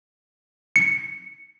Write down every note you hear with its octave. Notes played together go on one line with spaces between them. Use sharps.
C#7